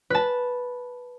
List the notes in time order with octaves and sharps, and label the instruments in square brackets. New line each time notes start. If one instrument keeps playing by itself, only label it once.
[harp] B4 A5